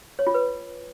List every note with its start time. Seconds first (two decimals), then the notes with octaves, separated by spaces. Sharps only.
0.19 C#5
0.27 F4
0.34 B4